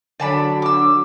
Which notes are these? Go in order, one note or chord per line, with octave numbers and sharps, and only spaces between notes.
D3 F#3 D5 A5 B5
D6 E6